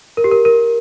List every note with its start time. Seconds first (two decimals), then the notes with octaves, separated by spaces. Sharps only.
0.17 A#4
0.24 G4
0.31 A#4
0.45 A#4